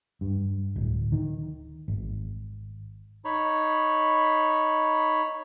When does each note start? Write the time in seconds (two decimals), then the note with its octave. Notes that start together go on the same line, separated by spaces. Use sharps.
0.21 G2
0.76 D1
1.12 D#3
1.88 G#1
3.25 D#4 C#5 B5